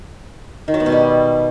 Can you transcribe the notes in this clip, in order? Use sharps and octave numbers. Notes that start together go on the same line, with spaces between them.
D#3
F#3
B3
B2
G3